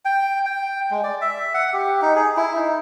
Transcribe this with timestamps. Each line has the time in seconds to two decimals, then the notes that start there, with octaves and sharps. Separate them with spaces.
0.05 G5
0.46 G5
0.91 G#3
1.04 D5
1.21 E5
1.54 F#5
1.73 G4
2.02 D#4
2.15 G#4
2.37 E4
2.56 D#4